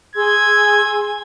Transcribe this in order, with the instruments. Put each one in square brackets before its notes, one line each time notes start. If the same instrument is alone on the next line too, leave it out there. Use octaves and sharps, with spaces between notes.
[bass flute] G#4 [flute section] G#5 C6 E6 [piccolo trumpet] G#6